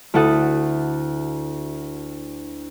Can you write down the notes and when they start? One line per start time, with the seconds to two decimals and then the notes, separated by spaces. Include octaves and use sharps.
0.14 D2 E4 A4 F#5 D#6